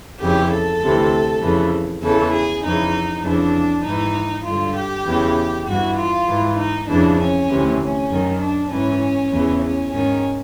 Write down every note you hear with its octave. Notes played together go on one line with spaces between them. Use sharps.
F2 C#3 E3 G4
A4
D2 C3 E3
F2 C#3 E3
E2 C#3 E3 A4
G#4
F2 C#3 E3 D#4
F2 C#3 E3 D4
G#2 E3 D#4
G2 D3 F4
G4
E2 C#3 E3
G2 E3 F#4
F4
G#2 E3
D#4
F2 C#3 E3 D4
C#4
D2 C3 E3
C#4
F#2 D#3
D4
G#2 E3 C#4
E2 C#3 E3
C#4
G#2 D#3 C#4